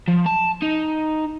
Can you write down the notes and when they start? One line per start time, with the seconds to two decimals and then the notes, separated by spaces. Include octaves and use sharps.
0.08 F3
0.26 A5
0.62 D#4